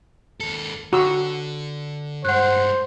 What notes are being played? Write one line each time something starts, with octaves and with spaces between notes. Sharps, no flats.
D#2 A4
D3 F#4 E6
G2 G#3 C5 F#5 F#6